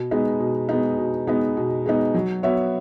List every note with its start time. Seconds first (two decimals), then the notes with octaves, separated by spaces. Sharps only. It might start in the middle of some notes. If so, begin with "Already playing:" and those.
Already playing: B2
0.11 G#3 B3 D#4
0.40 B2
0.69 G#3 B3 D#4
0.98 B2
1.27 G#3 B3 D#4
1.57 B2
1.86 G#3 B3 D#4
2.14 F#3
2.43 B3 F#4 C#5 E5